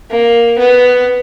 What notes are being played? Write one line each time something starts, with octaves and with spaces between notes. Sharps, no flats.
A#3
B3